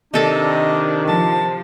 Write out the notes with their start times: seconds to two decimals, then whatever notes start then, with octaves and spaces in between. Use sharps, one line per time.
0.14 C3 D#3 D4 A4 D#5 D6
1.08 F3 A5